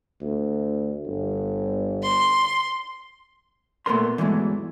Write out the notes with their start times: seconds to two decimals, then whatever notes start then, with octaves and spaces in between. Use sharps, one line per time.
0.21 D2
1.06 G1
2.03 C6
3.86 A#2 A3 B3 A#4 C6
4.18 E2 G#2 E3 F#3 G#3 A3